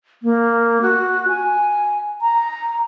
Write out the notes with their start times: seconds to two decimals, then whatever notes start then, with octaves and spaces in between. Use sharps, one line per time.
0.23 A#3
0.82 F#4
1.29 G#5
2.22 A#5